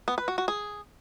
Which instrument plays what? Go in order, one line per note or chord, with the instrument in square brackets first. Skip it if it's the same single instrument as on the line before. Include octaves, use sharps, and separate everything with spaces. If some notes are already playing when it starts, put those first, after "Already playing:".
[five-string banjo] B3
B4
F#4
F#4
G#4